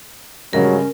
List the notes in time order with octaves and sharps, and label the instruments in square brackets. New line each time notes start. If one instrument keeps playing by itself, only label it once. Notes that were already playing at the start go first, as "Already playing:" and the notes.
[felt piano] G2 C#3 G#3 [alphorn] F#3 [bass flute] C#4 [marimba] A#4